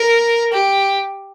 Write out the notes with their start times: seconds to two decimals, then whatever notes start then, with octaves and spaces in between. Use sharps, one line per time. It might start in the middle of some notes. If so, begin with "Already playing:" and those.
Already playing: A#4
0.53 G4